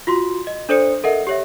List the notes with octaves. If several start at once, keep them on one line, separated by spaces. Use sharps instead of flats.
F4 F#4 C6
D#5
D4 A4 C5 D5 D#6 C#7
A4 A#4 D#5 E5 F#5
G4 C#5 E5